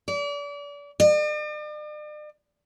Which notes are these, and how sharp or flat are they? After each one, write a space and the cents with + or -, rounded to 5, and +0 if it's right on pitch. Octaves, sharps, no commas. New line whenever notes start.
D5 -35
D5 +45